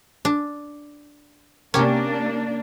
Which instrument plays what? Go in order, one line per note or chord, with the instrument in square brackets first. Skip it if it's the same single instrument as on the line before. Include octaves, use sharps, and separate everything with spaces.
[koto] D4
[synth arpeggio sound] C3 G4 A#4 [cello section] A#3 D4 [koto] C#4